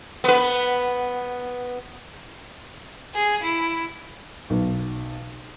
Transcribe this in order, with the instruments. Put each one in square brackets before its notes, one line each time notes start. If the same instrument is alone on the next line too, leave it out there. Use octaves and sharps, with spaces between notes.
[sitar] B3 B4
[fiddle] G#4
E4
[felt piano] B1